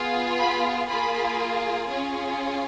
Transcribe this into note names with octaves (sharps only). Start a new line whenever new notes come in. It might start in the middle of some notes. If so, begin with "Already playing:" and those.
Already playing: B3 F4 G#4
B5
A#3 F4 G#4 B5
C#4 F4 G#4